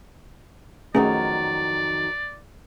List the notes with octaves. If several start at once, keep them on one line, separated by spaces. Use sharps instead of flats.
F2 D#3 F#3 A3 C#4 G#4 D5